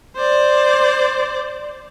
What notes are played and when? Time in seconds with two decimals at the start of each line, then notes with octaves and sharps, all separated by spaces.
0.17 C5 D5